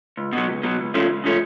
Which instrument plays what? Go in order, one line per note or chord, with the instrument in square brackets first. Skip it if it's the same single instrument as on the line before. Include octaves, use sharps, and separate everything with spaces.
[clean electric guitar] C#2
B2 F#3
C#2
B2 F#3
C#2
C#3 F3 A3 C#4
C#2
C#3 F3 A3 C#4